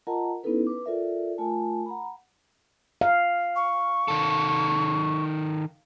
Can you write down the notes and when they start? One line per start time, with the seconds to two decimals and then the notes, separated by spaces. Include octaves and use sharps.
0.07 F4 A#4 D#5 F#5 A5 A#5
0.43 B3 C#4 D#4 E4 A4 B4
0.67 B4 D6
0.86 F4 A4 A#4 D5 E5
1.38 A3 F4 A#4 G#5 A5
1.86 F#5 A#5 B5
3.01 F5
3.56 C#6
4.08 D#3 A4